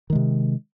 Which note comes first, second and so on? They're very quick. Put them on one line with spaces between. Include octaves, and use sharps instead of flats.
D#3 G#3 C3